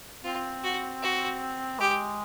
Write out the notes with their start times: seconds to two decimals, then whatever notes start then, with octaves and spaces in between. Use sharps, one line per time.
0.24 C4 F4
0.63 F#4
1.02 F#4
1.79 G#3 G4